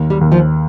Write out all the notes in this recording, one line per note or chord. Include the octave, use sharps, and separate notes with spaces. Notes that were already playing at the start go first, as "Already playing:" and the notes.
Already playing: D#2
G3
D#2
F3